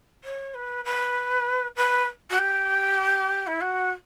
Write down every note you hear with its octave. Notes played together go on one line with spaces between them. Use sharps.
C#5
B4
B4
B4
F#4
G4
E4
F#4